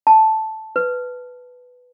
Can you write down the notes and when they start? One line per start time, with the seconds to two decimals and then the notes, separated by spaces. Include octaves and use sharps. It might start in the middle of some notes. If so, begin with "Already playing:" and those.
0.07 A5
0.76 B4